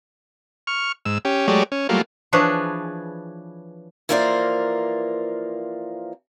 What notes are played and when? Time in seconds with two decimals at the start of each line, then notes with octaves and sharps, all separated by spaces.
0.67 C#6 F6
1.06 G#2 E6
1.25 C#4 G4
1.48 F#3 G#3 A3 G4 C#5 D5
1.72 C#4
1.89 F#3 G3 A3 A#3 F4
2.33 E3 F3 D4 G#4 B4 C#5
4.09 E3 F3 A#3 A#4 C5 D5